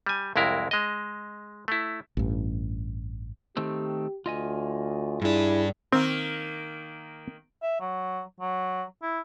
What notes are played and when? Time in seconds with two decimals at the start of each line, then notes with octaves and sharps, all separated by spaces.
0.06 G3 G#5
0.36 C2 F2 G#3 E4 A#4
0.71 G#3 D#5
1.68 A3 E4
2.17 A1 G2
3.57 D#3 A3 C4 G4
4.26 D2 F4 D#5 G#5
5.22 G2 D4 E4 G#4
5.92 D#3 A#3 C4 A#4
7.63 E5
7.81 F#3
8.41 F#3
9.03 E4